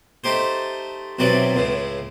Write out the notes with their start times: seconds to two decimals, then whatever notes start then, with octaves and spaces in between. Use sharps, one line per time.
0.24 A3 D#4 G4 C5
1.19 B1 C3 E3 F#3 D5
1.55 C#2 A2 C#3